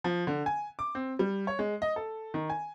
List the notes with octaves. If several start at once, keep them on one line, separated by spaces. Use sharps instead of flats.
F3
D3
G#5
D6
C4
G3
C#5
G#3
D#5
A4
D#3
G#5